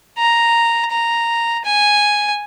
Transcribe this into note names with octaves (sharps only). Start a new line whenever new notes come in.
A#5
A#5
G#5